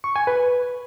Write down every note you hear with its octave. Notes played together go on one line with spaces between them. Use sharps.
C#6
G#5
B4